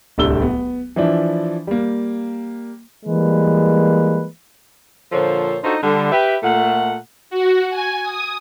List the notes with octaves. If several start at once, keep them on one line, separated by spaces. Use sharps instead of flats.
D1 C2 D3 G3 E6 G7
B3
E3 F3 D4 E4
G3 A#3
E3 G3 G#3 A#3 B4
A#2 D3 F3 A4 C5 C#5
D4 D#4 F4 F#4 A4 C5
D3 G3
G4 B4 E5
A#2 A3 F#5
F#4
G#5
D#6